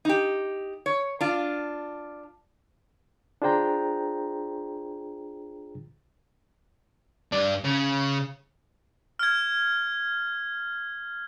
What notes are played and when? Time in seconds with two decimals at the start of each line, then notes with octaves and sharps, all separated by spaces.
0.05 D#4 G4
0.86 C#5
1.21 D4 F4
3.42 D4 F4 G#4 C5 G5 A#5
7.32 G2 D5
7.64 C#3
9.19 F6 G#6